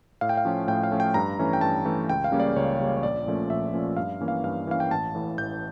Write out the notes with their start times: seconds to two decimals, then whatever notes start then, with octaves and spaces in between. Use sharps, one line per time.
0.21 A2 F5
0.29 G5
0.37 F5
0.45 F3 A3 C#4
0.67 A2 G5
0.84 F5
0.91 F3 A3 C#4
1.00 G5
1.14 G2 A#5
1.39 E3 A3 C#4
1.53 G5
1.61 G2 A5
1.85 E3 A3 C#4
2.09 C#2 G5
2.24 F5
2.32 C#3 G3 A#3 C#4
2.40 D5
2.56 C#2 C#5
2.80 C#3 G3 A#3 C#4
2.97 C#5
3.03 A#1 D5
3.26 A#2 F3 A3 C#4
3.50 A#1 E5
3.74 A#2 F3 A3 C#4
3.97 G2 F5
4.21 E3 A#3 C#4
4.28 F5
4.44 G2 F5
4.67 E3 A#3 C#4 F5
4.80 G5
4.91 A1 A5
5.15 A2 E3
5.38 A1 G6